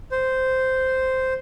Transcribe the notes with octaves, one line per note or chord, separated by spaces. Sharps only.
C5